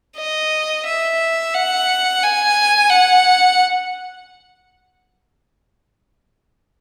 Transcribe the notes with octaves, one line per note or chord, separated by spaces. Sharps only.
D#5
E5
F#5
G#5
F#5